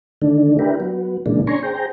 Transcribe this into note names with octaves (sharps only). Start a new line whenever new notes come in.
D3 D#3 A3 D4
D4 E4 G4 A#4 B4
F#3 B3
A#2 C#3 E3 G#3 A#3 D4
C#4 D4 G#5 A#5 C6 C#6
G#4 C5 G5 A#5